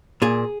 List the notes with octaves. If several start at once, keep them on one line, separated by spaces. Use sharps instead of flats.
A#2 G#4